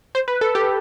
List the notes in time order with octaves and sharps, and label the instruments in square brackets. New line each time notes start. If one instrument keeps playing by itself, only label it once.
[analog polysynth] C5
B4
A4
G4